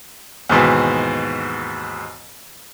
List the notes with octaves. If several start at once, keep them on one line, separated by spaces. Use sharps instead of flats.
D#2 G#2 B2 E3